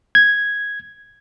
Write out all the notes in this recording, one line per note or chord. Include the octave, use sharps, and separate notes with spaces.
G#6